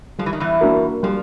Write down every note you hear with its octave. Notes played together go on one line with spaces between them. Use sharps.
F3 G3
E3
D#3
E2 E3
A#3 D4 F#4 A#4
F3 G3